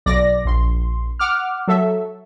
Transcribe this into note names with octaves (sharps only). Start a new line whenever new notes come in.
B1 D5 A#6
A#1 C6
F#5 D6 F6
F#3 A4 E5